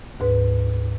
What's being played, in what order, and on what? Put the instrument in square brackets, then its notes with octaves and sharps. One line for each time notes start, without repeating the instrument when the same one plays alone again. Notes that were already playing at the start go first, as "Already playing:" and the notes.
[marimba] D2 G#2 B4